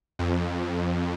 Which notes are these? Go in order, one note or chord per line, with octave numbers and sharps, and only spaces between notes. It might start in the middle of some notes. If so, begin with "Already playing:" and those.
F2